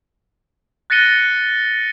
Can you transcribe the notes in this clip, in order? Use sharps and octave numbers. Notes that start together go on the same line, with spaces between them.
F#6 A6 A#6 C#7 D#7 G7